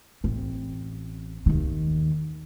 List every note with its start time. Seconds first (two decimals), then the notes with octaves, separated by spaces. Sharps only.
0.24 A1 C4
1.46 D#2 D#3